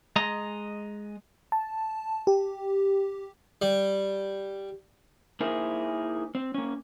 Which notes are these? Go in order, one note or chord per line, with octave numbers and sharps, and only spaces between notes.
G#3 D#5 A#5
A5
G4
G3
A#3 D#4 E4 G#4 A#4 C5
C4
A#3 C#4